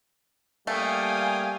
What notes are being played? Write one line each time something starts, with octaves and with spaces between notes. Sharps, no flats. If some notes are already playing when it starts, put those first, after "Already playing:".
G3 A3 A#3 F5 G5 G#5 D#6